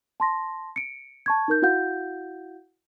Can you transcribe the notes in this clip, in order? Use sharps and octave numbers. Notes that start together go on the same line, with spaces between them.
A5 C6 A#6
C#7 D7
A5 C#6 G#6
D#4 A#4 G6
E4 F#4 F5 F#5 G6